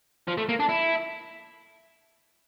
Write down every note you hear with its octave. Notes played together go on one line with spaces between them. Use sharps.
F3
A3
A#3
D4
E4